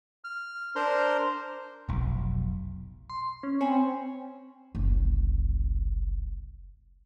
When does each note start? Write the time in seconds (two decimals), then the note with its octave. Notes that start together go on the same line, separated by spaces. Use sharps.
0.24 F6
0.76 D4 A#4 C5 A#5 C6
1.89 F1 B1
3.10 C6
3.43 C#4
3.61 C4 C5 C#5 G#5 B5
4.75 F#1 C2